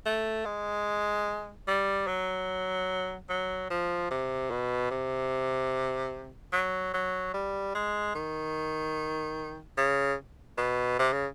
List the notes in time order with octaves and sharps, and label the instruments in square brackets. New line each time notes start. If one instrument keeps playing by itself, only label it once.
[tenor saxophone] A3
G#3
G3
F#3
F#3
F3
C3
B2
C3
F#3
F#3
G3
G#3
D#3
C#3
B2
C3
C#3